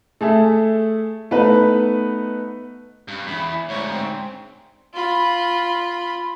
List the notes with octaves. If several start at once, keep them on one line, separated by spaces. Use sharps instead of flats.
A3 G#4 A4 E5
A3 B3 D#4 B4
G2
E2 B5
E4
D2 G#2 C#5
C4
F4 B5